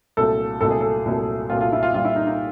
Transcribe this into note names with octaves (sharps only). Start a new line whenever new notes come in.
C2 A#2 F#3 A3 A4
C2 A#2 F#3 A3 A4
G#4
A4
C2 A#2 F#3 A3
C2 A#2 F#3 A3 F4
F4
E4
F4
A#2 G3 F4
E4
D#4
D#4